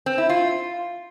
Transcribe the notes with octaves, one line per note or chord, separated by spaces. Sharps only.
C4
E4
F4